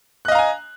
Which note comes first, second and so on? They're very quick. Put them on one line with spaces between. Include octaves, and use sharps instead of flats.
F#6 D#5 F5 A#5 G#5